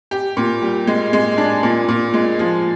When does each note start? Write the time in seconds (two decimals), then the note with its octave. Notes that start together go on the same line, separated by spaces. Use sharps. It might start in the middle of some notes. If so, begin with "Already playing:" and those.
0.11 G4
0.37 A#2
0.62 G3
0.87 G#3
1.13 G#3
1.38 D4
1.63 A#2
1.88 A#2
2.14 G#3
2.39 F3